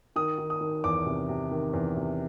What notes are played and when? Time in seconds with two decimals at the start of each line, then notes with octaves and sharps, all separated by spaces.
0.16 D#3 D#6
0.38 D#3
0.50 D#6
0.61 D#3
0.84 E2 D6
1.06 C3
1.29 C3
1.51 D#3
1.73 E2
1.97 C3